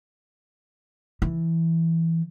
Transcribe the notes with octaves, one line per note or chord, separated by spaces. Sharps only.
E3